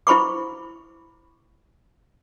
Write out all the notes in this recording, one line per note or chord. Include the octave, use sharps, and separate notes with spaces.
E4 C5 B5 C#6 D6